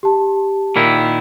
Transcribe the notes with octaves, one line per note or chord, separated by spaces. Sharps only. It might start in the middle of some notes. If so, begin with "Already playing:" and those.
G4 A5
A#2 D#3 E4